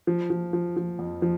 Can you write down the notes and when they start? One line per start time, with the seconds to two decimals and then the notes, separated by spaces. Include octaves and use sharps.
0.07 F3
0.30 F3
0.53 F3
0.77 F3
0.99 F2
1.22 F3